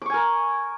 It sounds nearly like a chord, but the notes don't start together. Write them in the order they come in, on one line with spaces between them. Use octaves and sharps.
D6 C#6 G#5 A#4